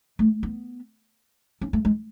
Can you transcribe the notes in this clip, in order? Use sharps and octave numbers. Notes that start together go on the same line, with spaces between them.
A3
B3
C#4
A3
G#3